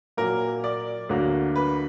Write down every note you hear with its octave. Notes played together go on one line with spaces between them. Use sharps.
A#2 F#3 A#3 A#4
D5
D2 D3 F#3 A#3
B4